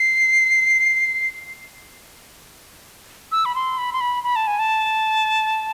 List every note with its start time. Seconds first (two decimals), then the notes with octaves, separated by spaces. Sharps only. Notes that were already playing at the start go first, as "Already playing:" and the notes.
Already playing: C7
3.32 E6
3.45 B5
3.55 C6
3.78 B5
3.93 C6
4.00 B5
4.23 B5
4.36 A5
4.47 G#5
4.59 A5